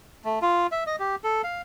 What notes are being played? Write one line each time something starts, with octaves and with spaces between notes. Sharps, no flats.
A3
F4
E5
D#5
G4
A4
F5